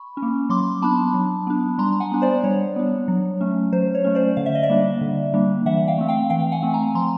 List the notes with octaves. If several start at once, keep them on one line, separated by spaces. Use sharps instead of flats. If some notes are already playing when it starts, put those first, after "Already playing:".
Already playing: B5 C#6
C#4
A#3
F#3 C6 D6
B3 D4 A5 B5
F#3
B3 D4
G3 A#5 C6
F#5 G#5
B3 D4
C5 D5
G3 C#5
B3 D4
F#3
A3 C#4
F#3 C5
C#5
A3 C#4
C5 D5
D3 F5
E5
D#5
D5 E5
G3 A#3 D4
D3
G3 A#3 D4
E3 E5 F#5
F5 G5
A3 C4
F5 G5
E3 F5 G5
F#5 G#5
A3 C4
G#5 A#5
F3 A#5 C6